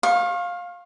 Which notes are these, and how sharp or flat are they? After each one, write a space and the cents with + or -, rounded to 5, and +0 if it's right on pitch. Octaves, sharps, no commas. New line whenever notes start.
F5 +15 C#6 -40